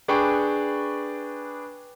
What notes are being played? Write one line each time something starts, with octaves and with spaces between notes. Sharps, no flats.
D4 G#4 B4 G5 C#6